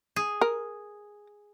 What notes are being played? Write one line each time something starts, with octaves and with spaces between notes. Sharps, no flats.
G#4
A#4